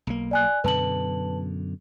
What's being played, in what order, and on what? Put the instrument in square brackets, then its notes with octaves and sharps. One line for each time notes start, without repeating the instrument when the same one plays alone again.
[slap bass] B1 A#3
[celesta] D5 G#5 F#6
[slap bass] F#2 B2 D3 [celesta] B4 A5 F#7